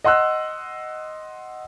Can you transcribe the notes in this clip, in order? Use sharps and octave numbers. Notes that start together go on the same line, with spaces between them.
D#5 F#5 C6 E6 F#6